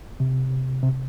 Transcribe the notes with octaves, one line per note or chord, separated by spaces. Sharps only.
C3
C3